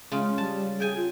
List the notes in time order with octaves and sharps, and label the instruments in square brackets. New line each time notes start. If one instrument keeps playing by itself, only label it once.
[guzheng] C#3 F4 [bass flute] G#3
[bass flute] G3 [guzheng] A5
[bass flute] G#4 [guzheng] G5 G#5
[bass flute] F4